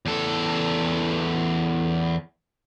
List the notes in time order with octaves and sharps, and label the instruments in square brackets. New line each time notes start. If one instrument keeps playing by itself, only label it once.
[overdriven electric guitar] E2 A4